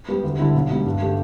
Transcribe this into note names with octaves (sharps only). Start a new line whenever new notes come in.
G3 B3 G4
D2
D3 G3 E4
B1
B2 G3 D4
G2
D3 A3 G4